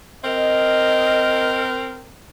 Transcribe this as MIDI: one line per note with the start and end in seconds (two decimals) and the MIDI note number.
0.24 2.10 60
0.24 2.10 70
0.24 1.66 75